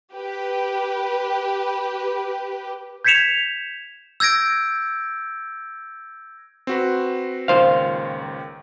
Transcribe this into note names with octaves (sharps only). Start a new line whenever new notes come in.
G4 B4
G6 G#6 B6 C#7 E7 F7
E6 G6 G#6 A#6 D7
C4 F#4 B4
C#2 A#2 D#3 C5 F5